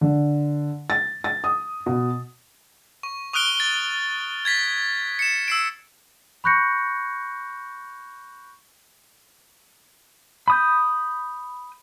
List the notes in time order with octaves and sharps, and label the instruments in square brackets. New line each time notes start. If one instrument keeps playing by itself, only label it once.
[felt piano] D3
A6
A6
D#6
B2
[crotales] C#6
C#6 D#6 F6 F#6 D7 G7
A6
G#6 A6 B6
C#7 E7
E6 C7 D7
[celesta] B5 C#6 F#6 G6 A#6 C#7
[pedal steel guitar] B5 D#6 G6